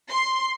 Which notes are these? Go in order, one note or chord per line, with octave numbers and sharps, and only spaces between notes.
C6